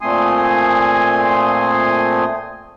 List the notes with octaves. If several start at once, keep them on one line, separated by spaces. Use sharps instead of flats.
A#2 A3 C4 G#5 C6 D#6